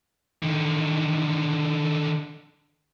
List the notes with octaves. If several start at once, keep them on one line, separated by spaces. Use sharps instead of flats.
D3 D#3